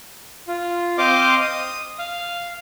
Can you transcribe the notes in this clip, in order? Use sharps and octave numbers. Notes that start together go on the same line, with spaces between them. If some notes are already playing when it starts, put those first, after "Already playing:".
F4
C4 C5 D#5 F5 C6 D6
D#6
F5